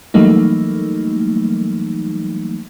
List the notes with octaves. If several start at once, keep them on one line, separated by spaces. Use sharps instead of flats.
E3 F#3 G3 A3 A#3 D#4